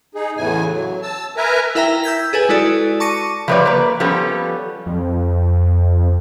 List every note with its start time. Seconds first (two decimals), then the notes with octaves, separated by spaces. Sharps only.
0.15 D#4 G#4
0.37 E2 A2 C#3 E3 G#5
0.70 F#3
1.02 A5 E6
1.37 A#4 B4 E5 G#5 A#5
1.75 E4 A#4 E5 G5 A#5
2.04 E6 G6 G#6 B6
2.33 G#4 A4 B4 G#5
2.49 G#3 E4 F#4 A4 D5
3.00 A5 C#6 D6 A#6 C#7 D#7
3.48 F3 G3 A3 B4 C#5 D5
3.65 A#3 B4
4.00 F3 G3 B3 C#4 A4
4.86 F2